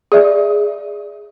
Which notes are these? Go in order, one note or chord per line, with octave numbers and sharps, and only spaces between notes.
G#4 D5 E5